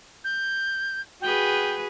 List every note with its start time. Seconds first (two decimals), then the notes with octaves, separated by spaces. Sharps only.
0.24 G6
1.21 F#4 G#4 B4 G5